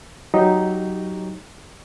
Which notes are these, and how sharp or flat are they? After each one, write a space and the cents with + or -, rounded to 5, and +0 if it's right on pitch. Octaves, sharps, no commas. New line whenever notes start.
F#3 +10 D#4 +0 G4 +0